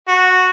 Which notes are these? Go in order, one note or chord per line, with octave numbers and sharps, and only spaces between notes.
F#4